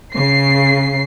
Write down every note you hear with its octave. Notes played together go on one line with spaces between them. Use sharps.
C#3 C7